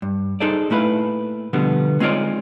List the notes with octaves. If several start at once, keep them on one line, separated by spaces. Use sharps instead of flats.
G2
D#4 G#4 A4 C5 D5
A#2 A3 E4 B4 F5
B2 D3 F3 G3 B3
G#3 C4 D#4 F4 C#5 D5